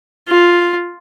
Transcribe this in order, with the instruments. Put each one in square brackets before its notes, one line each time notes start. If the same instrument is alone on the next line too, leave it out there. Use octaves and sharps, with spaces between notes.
[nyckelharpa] F4